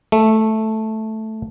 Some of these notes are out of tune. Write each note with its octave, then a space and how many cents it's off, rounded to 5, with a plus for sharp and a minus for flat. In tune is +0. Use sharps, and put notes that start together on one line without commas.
A3 -5